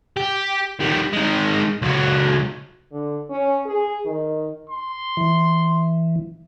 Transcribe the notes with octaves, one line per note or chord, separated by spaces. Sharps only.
G4
D#3 G3
D#3 G#3
C#2 F#3
D3
C#4
G#4
D#3
C6
E3